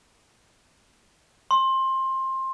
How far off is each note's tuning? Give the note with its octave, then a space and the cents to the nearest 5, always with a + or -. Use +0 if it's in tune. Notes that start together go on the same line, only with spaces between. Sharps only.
C6 +20